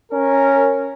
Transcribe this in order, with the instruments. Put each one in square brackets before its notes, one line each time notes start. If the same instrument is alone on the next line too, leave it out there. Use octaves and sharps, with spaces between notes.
[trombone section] C#4 A#4